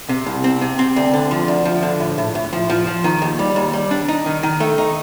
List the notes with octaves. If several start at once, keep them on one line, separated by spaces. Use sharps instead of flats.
C3
C2
C4
C3
C4
D2
D3
F3
D2
F3
D3
A2
A2
A2
F3
F3
F3
D#3
D#2
G3
D#2
G3
D4
D#4
D#3
D#3
A3
D#4